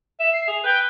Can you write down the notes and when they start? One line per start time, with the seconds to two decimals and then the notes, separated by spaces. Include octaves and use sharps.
0.20 E5 E7
0.33 C7
0.47 G#4 F7
0.64 B4 G5